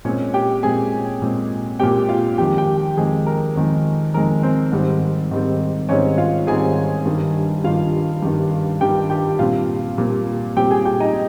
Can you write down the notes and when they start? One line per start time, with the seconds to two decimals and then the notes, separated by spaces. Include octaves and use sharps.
0.05 A#2 G#3 C4 C#4 C#5
0.34 G4 G5
0.63 A#2 G#3 C4 G#4 G#5
1.22 A#2 G#3 C4
1.80 A#2 G#3 C4 G4 G5
2.09 F4 F5
2.38 F2 D#3 G#3 G4 G5
2.58 G4 G5
2.97 F2 D#3 G#3 G#4
3.26 A#4
3.56 F2 D#3 G#3
4.14 F2 D#3 G#3 A#4
4.43 C4 C5
4.72 G#2 D#3 G3 C4
5.31 G#2 D#3 G3 C4
5.89 G#2 D#3 G3 C4 C#4 C#5
6.18 F4 F5
6.47 G#2 D#3 G3 C4 G#4 G#5
7.06 G2 D#3 G3
7.64 G2 D#3 G3 F4 F5
8.22 G2 D#3 G3
8.81 G2 D#3 G3 G4 G5
9.10 G4 G5
9.39 A#2 G3 C4 F4 F5
9.98 A#2 G3 C4
10.56 A#2 G3 C4 G4 G5
10.71 G#4 G#5
10.85 G4 G5
11.00 D#4 D#5